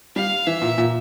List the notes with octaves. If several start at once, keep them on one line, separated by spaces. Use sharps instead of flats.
G3 F5
E3 E5
A#2
A#2